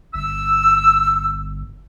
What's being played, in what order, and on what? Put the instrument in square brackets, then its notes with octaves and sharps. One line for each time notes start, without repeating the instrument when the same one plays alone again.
[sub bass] G1 [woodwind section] E6